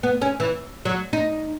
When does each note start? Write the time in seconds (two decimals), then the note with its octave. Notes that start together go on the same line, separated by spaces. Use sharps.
0.03 B3
0.22 C#4
0.40 E3
0.85 F#3
1.13 D#4